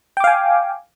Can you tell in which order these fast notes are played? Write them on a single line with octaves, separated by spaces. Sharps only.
G5 D6 F5 G#5